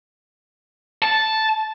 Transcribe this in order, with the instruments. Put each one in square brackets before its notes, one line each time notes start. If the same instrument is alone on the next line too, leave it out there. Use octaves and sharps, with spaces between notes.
[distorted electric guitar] A5